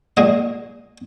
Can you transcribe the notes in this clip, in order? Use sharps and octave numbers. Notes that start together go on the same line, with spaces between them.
A#2 G#3 D#5